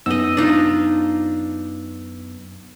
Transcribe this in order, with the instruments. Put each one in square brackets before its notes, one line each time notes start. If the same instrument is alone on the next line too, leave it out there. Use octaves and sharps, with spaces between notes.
[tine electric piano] F#2 B3 E6 [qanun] D#4 D#5
[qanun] D4 D#4 F4